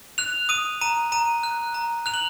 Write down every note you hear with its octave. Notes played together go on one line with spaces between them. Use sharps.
F#6 F7
D#6 D#7
A#5 D#7
A#5 D#7
F#6
A#5
F#6 F7
F#7